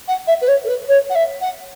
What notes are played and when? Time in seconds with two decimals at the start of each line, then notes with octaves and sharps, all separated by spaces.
0.08 F#5
0.27 E5
0.41 B4
0.48 C#5
0.64 A4
0.67 B4
0.88 C#5
1.09 F#5
1.15 E5
1.41 F#5